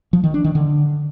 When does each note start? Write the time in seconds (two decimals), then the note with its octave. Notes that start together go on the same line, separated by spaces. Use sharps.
0.13 F3
0.24 D#3
0.34 D4
0.44 D#3
0.55 D3